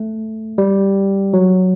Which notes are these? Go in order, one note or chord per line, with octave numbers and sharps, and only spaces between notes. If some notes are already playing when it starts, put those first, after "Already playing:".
Already playing: A3
G3
F#3